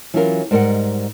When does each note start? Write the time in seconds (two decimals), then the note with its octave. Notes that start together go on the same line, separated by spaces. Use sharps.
0.14 E3 F#3 C#4 F4 G#4 A#4
0.51 G#2 G3 A#4 C5 D#5 F#5